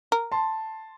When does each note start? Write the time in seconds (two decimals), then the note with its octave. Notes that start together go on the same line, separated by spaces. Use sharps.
0.12 A#4
0.32 A5 C6